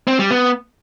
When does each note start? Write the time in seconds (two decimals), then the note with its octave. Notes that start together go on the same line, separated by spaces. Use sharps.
0.07 C4
0.19 G3
0.31 B3